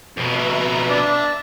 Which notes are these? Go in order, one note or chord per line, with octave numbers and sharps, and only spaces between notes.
F2 B2 B4 E5 A#5
D4 D5 E5